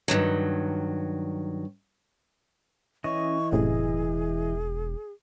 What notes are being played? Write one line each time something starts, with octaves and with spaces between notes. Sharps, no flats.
G2 B2 D#3 F#3
E3 C#4 D#5 C#6
E1 F#2 A2 C3 G#4